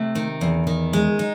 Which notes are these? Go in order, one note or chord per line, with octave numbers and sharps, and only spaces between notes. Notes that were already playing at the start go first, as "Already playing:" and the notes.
Already playing: C3 A3
D#3
E2
D#3
G#3
D#4